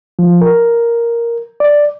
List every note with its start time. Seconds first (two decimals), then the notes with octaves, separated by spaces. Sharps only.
0.19 F3
0.41 A#4
1.60 D5